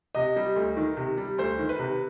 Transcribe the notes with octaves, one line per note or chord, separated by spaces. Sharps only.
C3 D#5
G3
D2
D#3
C3
G3
D2 C5
D#3
B4
C3